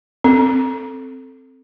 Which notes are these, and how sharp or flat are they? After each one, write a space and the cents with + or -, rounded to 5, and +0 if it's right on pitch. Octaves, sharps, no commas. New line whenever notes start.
C4 +0 A4 +5